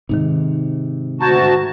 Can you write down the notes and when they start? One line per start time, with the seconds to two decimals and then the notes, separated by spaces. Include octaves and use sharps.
0.09 G#2 C3 D#3 D#4
1.21 D2 F#4 A5 A#5 G6 G#6